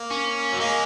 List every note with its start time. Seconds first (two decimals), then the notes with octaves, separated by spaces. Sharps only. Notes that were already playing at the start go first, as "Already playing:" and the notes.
Already playing: A#3
0.11 C#4
0.53 F#3
0.59 G#3 A#3